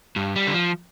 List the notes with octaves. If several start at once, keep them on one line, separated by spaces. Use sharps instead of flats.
G2
G3
D3
F3